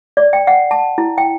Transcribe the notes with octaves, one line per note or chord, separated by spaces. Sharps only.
D5
G5
F#5
A5
E4
G5